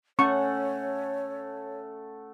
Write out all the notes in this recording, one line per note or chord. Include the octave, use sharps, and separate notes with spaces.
A3 C#4 C#5 F#5 C#6